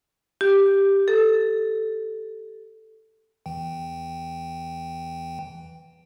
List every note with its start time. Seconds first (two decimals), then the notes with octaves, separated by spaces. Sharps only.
0.41 G4
1.08 A4
3.46 E2 E3 G5